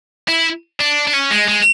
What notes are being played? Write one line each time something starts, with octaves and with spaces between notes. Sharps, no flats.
E4
D4
D4
C#4
G#3
G#3